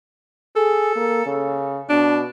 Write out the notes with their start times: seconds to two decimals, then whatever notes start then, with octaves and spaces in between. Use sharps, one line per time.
0.56 G#4 A4
0.96 A#3
1.26 C#3
1.90 B2 D4